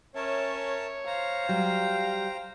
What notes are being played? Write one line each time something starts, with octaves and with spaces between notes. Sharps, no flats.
C#4 A#4 C#5 E5 A5
C5 F5 A#5
F#3 G3 G5